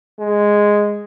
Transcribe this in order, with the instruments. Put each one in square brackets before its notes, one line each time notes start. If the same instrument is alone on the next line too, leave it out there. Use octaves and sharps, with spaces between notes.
[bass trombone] G#3